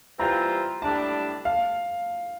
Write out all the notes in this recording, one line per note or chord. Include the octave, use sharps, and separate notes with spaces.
E3 G3 C4 F4 A#5
A2 G3 D4 A5
F5